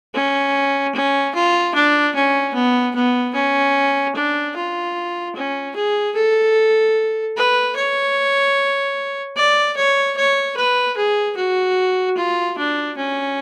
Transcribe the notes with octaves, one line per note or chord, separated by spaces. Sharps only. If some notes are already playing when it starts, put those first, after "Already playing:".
C#4
C#4
F4
D4
C#4
B3
B3
C#4
D4
F4
C#4
G#4
A4
B4
C#5
D5
C#5
C#5
B4
G#4
F#4
F4
D4
C#4